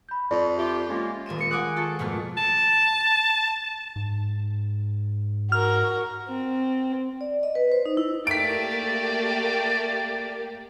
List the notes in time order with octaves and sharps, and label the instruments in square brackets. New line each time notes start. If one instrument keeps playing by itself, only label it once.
[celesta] B5 G6
[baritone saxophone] F2 [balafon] D5
[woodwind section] F4 G4 [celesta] E5
[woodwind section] G#3 A#3 F4 [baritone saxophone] C#4
[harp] D#1 A#4 D#7 E7
G#3 C#7
F#5 G#5 D6 D#6 F#6
F4 A4 A5 C#6
G#1 F2 B2 A3 A#3 F6
[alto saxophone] A5
[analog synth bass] G#2
[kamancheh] F#4 A#4 [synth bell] F6
[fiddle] C4
[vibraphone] D5
D#5
B4
C5
D#4
E4
[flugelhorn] A3 [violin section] A#3 G4 [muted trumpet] D5 [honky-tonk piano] B6 D7